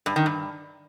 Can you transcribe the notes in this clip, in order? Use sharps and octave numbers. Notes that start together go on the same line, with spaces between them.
G2
D#3
G2